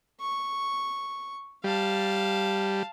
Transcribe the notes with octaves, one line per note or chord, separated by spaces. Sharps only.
C#6
G3 F5 A5